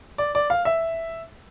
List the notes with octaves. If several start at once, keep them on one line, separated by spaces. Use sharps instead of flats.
D5
D5
F5
E5